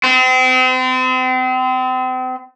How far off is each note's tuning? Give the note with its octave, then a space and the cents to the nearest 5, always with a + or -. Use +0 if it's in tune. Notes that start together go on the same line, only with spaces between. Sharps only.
C4 -35